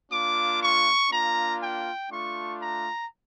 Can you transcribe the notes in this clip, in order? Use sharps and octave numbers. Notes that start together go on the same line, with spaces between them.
A#3 D4 F4 D6
C#6
A#3 D4 F4 A#5
G5
A3 D4 F4 C#6
A#5